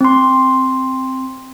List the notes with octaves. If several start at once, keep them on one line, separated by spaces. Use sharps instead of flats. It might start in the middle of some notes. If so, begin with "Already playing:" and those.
C4 C6